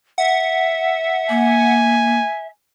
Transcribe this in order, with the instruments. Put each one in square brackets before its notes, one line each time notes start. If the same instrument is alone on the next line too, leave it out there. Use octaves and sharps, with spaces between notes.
[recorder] E5 [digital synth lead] F#5
[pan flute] A#3 [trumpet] G#5